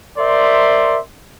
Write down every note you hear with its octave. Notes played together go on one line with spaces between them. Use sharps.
A#4 C5 D5 E5 C6